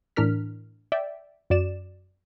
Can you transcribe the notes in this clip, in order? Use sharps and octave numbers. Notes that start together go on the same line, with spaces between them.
A2 E3 D4 A#4 F6 B6
D5 E5 G5
F#2 F#4 D5 E7